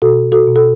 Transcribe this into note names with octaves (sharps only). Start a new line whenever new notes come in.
B2 F#4 A4
F#4 A4
B2
A4